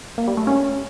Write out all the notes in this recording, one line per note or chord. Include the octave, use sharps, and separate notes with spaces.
A#3
G3
A3
C#4